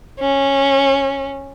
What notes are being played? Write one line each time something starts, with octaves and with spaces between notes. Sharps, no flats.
C#4